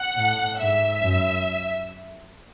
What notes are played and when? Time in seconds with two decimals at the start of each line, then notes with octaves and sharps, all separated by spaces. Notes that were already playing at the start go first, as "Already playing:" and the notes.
Already playing: F#5
0.17 A2
0.59 G#2 E5
1.02 F#2